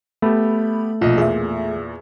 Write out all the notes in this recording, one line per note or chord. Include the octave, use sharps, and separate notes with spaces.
A3 B3 G4 B5
A#1 B2 F4 D#5
E2 A#2 G#4 E5